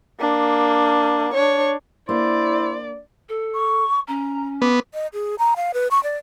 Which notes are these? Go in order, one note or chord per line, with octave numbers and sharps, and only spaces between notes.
A#3 D4
D4 C#5
A#3 D4 E4 A#4 C5 D5
A4
C#6
C#4 A#5
B3 D6
D#5
G#4
A#5
F5
B4
C#6
D5